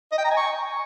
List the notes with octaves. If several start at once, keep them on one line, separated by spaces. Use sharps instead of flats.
D#5
G5
A#5
G#5
C#6